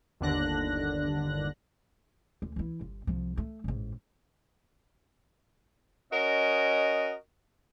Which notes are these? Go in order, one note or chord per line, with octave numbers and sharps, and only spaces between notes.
G1 D#2 D3 D4 F#6 A#6
D2
E3 E4
G1
C2 F3
A3
A1 G#2
C#4 F#4 A#4 D#5